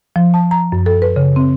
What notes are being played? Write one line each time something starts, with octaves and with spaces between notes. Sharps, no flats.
F3
A5
A#5
F#2
A4
B4
C#3
C4